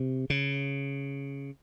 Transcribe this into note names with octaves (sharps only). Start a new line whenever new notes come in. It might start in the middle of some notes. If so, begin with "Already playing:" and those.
Already playing: C3
C#3